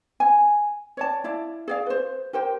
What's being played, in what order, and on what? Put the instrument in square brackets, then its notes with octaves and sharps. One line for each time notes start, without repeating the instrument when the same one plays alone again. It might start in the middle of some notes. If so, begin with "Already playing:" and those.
[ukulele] G#5
C#5 D5 A5
E4 D5 F5
G#4 D5 F5
B4 C5
G4 A#4 C5 G5